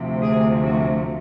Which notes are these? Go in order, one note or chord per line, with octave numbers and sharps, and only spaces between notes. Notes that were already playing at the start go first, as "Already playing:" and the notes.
Already playing: D2 C3 F3 A3
G#4
F#4